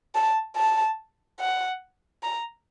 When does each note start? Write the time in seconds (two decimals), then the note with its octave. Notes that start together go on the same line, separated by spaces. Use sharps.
0.15 A5
0.56 A5
1.40 F#5
2.23 A#5